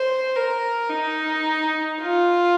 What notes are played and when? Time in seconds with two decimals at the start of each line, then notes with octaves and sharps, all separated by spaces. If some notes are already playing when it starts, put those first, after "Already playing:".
Already playing: C5
0.35 A#4
0.89 D#4
2.01 F4